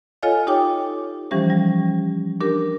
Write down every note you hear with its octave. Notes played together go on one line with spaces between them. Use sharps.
F4 A4 C#5 D#5 F5 G#5
D#4 G4 C#5 G5 D6
E3 F3 G3 C#4 G4 C5
G3
D4 G4 A#4